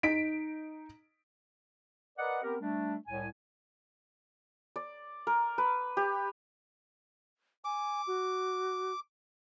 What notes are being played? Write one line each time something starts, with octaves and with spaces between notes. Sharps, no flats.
D#4 B6 D7
A#4 B4 D5 D#5 F#5
B3 C4 G4 A#4
G3 A3 D4
C2 A2 G#5
D5
A#4
B4
G4
G#5 D6
F#4